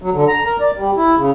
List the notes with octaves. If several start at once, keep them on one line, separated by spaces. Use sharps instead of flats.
F#3
D3
A#5
A#4
D5
G3
E4
C#3